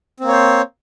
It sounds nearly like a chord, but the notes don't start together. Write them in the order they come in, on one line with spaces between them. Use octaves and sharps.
C4 A#3 C#5 C5